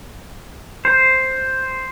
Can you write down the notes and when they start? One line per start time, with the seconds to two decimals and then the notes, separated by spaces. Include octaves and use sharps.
0.85 C5